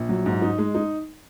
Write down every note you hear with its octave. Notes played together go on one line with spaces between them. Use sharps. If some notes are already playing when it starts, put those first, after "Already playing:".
Already playing: A#1
F#3
G#2
D#4
G#3
D#4